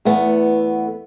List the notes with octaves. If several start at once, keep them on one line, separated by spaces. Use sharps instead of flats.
E2 A3 B3